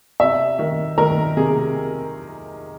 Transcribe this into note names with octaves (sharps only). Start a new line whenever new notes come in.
C3 E5
D#3
D#3 A#4
C3 G#4